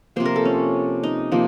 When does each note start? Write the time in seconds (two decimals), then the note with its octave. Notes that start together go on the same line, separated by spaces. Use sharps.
0.16 C3 F3 A#3 C5
0.25 A#4
0.36 A4
0.45 C#4
1.03 D#4
1.32 C3 F3 A#3